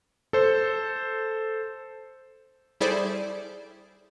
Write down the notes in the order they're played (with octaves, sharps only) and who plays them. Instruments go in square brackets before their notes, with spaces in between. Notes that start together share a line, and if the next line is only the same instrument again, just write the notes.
[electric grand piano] A4 C5
[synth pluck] G3 E4 G#4 A4 C5 D5